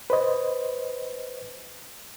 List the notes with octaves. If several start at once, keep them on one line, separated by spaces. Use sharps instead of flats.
B4 C5 D#5